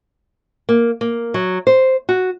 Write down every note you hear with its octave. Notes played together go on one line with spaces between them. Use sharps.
A#3
A#3
F#3
C5
F#4